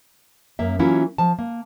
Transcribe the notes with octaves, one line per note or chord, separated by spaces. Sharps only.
F#2 A#3 E5
E3 F#3 A#3 C#4 E4 F4
F3 A5
A#3